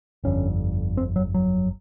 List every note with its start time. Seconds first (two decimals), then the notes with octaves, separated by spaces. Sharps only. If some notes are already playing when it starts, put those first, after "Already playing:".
0.24 G1 F2 D3 C#4
0.97 C4
1.16 F#3
1.34 F#3